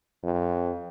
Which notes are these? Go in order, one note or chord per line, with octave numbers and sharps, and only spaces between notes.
F2